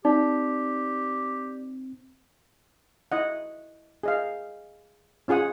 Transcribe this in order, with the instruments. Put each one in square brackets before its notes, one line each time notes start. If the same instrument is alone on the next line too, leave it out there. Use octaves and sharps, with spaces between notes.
[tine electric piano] C4 [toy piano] D#4 [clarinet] G4 [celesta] D5
[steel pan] E4 D#5 F#5
G#4 D#5 F5
C#4 F4 G#4 F#5 D#6